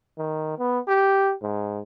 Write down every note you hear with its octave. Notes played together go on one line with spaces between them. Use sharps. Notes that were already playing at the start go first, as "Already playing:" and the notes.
D#3
B3
G4
G#2